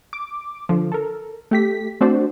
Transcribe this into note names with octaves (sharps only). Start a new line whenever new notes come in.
D6
D3 F3
A4 A#4
A3 G4 B6
A3 C4 D4 F#4 C5 D5